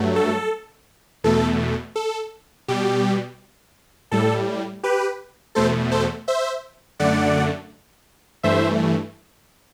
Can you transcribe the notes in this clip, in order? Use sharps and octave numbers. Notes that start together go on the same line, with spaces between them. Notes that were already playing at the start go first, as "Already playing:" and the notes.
Already playing: G2 F#3 A3
A4
E2 B2 A3 A4
A4
B2 G3 G4
A2 G3 A4
G4 B4
E2 B2 A3 A4 C5
A4 C5
C5 E5
F#2 D3 A3 D5 F#5
G2 E3 A3 C5 E5